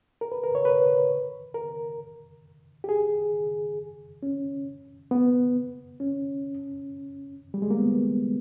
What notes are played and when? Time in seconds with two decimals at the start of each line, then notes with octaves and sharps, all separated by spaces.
0.21 A#4
0.32 B4
0.44 A#4
0.55 C#5
0.65 B4
1.54 A#4
2.84 G4
2.89 G#4
4.23 C#4
5.11 B3
6.00 C#4
7.54 G3
7.62 G#3
7.71 A#3
7.78 B3